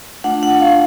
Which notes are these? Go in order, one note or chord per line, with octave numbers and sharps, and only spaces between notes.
A3 D4 F4 F#5
F#5
F5